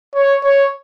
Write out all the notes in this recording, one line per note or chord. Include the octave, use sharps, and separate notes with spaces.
C#5
C#5